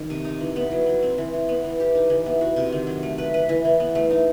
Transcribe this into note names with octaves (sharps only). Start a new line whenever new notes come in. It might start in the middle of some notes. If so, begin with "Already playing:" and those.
Already playing: D#3
C3
D#4
E3
B3
F#3
F#3
C4
E3
E3
B3
E3
G4
D#4
E3
B3
F#4
C3
D#3
F#3
A3
B4
B4
E3
E3
B3
A3
D#4